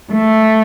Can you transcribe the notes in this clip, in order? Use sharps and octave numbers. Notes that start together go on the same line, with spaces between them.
A3